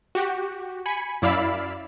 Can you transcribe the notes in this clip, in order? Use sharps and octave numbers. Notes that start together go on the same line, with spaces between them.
F#4 G4
G#5 B5 C#7
F#2 E4 D5 F5 B5 E6